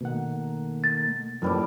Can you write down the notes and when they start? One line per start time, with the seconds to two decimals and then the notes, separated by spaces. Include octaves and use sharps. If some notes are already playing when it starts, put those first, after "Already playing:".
0.01 B2 D#3 A3 A#3 F#5
0.84 A6
1.42 F#2 A2 F3 G3 A#3 B4 D6